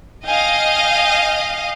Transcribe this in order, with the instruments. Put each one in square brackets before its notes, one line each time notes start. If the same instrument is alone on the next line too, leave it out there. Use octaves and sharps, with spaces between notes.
[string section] D#5 F5 [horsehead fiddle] G5 G#5